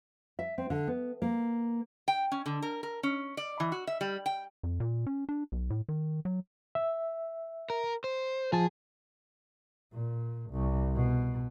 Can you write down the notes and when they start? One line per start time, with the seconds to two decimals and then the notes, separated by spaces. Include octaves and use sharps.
0.39 E5
0.58 C4
0.70 D3
0.88 B3
1.22 A#3
2.08 G5
2.32 C#4
2.46 D3
2.62 A#4
2.83 A#4
3.03 C#4
3.37 D5
3.60 E3
3.72 F#4
3.87 E5
4.01 G3
4.26 G5
4.63 F2
4.80 A#2
5.07 C#4
5.29 D4
5.52 B1
5.70 A2
5.89 D#3
6.25 F#3
6.75 E5
7.70 A#4
8.04 C5
8.53 F3 G#4 A5
9.94 A#2
10.51 C2
10.95 B2